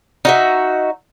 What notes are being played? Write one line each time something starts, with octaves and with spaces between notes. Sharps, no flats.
D#4 F#4 E5